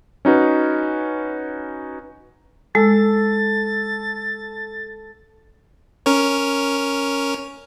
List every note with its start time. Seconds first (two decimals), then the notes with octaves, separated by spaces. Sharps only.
0.25 C#4 D#4 F#4 B4
2.75 G#3 A4 A6
6.06 C#4 A#4 C#5